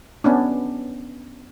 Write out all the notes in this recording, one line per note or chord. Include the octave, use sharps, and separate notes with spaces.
B3 C#4 D4